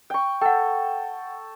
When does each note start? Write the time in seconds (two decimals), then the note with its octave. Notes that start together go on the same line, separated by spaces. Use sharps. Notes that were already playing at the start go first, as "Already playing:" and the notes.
0.10 G5 C#6
0.42 A4 F#5 G5